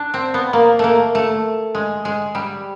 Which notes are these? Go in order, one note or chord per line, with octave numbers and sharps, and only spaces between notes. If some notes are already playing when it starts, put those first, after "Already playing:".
Already playing: D4
C4
B3
A#3
A3 A#3
A3
G#3
G#3
G3